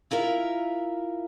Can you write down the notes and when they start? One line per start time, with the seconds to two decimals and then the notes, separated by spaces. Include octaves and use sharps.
0.11 E4 F4 A#4 E5